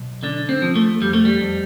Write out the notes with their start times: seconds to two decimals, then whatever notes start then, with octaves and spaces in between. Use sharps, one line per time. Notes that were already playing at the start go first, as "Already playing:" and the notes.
Already playing: B1
0.23 D3 D4
0.49 C4
0.62 F3
0.75 A3
1.01 F2 G3
1.13 A3
1.25 G3
1.41 F2